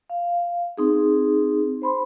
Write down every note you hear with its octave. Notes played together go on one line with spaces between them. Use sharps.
F5
C4 D#4 G#4
C5 B5 C6